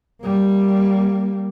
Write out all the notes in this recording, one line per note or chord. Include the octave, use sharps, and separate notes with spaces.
G3 A#3